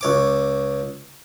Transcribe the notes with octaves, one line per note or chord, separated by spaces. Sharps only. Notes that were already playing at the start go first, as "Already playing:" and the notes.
C#2 C#5 D6